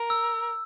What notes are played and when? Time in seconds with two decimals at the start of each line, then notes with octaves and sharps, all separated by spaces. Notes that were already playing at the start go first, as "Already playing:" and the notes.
Already playing: A#4
0.10 E6